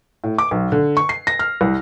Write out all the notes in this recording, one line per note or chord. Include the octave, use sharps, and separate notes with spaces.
A2
D6
B1
D3
C#6
C7
A#6
F6
C2